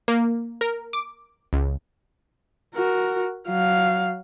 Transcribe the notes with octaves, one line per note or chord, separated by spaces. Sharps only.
A#3
A#4
D6
C#2
F#4 A#4
F#3 F5